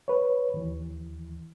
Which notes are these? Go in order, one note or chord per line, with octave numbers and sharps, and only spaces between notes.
B4 C#5
D#2 E3